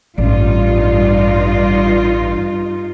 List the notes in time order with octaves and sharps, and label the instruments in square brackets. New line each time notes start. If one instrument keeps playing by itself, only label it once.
[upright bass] A1 [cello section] G2 D#4 F4 [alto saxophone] D5